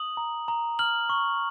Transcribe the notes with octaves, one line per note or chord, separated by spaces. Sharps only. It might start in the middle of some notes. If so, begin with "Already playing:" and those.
Already playing: D#6 F#7
A#5
A#5
F6 F#7
C#6